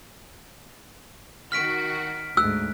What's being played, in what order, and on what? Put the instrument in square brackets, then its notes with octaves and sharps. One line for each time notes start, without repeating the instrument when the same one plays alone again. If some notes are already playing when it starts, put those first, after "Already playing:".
[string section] D#3 F#4 [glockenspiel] F6 B6 D7
[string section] D2 G#2 [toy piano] E6 [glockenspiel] F#6